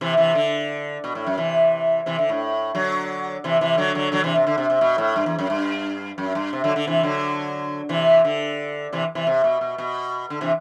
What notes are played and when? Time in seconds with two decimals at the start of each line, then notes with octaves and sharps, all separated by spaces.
0.01 C3 E3
0.17 C3 E3
0.35 D3
1.04 B2
1.15 A2
1.27 F#2
1.38 C3 E3
2.06 C3 E3
2.19 D3
2.29 A2
2.75 D3 F#3
3.44 C3 E3
3.61 C3 E3
3.78 D3 F#3
3.95 D3 F#3
4.12 D3 F#3
4.24 C3 E3
4.35 C3
4.47 D3
4.58 C3
4.70 C3
4.81 B2
4.98 A2
5.16 G2
5.26 E2
5.39 F#2
5.50 G2
6.18 F#2
6.35 G2
6.53 C3
6.64 D3 F#3
6.76 D3
6.87 C3 E3
7.03 D3 F#3
7.89 C3 E3
8.25 D3
8.93 C3 E3
9.15 C3 E3
9.27 C3
9.44 B2
9.61 B2
9.78 B2
10.30 D3
10.41 C3 E3